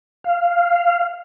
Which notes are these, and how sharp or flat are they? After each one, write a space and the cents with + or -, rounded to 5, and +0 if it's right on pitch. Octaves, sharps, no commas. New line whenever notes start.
F5 -10